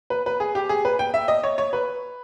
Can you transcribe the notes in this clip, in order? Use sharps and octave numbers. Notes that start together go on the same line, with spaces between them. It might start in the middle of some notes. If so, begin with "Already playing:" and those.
B4
B4
G#4
G4
G#4
B4
G5
E5
D#5
C#5
C#5
B4